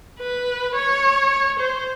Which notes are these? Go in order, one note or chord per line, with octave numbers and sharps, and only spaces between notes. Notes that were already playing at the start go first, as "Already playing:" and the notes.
B4
C#5
C5